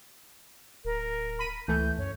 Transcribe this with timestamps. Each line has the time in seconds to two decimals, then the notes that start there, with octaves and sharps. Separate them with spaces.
0.85 D1 A#4
1.39 B5 B6 D#7
1.68 C#2 E3 A3 G6
1.98 F#2 C#5